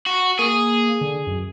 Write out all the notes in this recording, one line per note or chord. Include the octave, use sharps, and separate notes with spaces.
F#4
A#3 G#4
D3
F#2